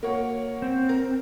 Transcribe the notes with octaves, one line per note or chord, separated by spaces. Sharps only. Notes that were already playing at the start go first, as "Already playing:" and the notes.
A#3 F#4 C#5
C4
A#4